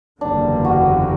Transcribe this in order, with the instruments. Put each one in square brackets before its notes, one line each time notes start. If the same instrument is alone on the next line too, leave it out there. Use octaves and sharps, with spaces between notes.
[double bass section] F#1 E2 D3 G3 A#3 [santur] D4
[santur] F#4